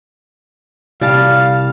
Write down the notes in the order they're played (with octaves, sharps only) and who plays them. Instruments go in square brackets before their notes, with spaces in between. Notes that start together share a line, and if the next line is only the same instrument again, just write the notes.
[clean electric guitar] C2 [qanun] G3 A5 [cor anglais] F5